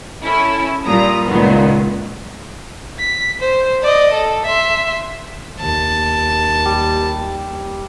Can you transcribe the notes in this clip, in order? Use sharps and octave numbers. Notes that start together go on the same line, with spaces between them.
C#4 E4 A4
A#2 G3 A#5 D#6
C#2 A#2 D#3 B3
B6
C5
D5 D#5
A4
E5 C6
D#2 A5
G3